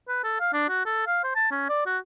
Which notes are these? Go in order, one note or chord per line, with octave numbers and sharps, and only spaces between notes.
B4
A4
F5
D4
F#4
A4
F5
C5
A5
C#4
D5
F#4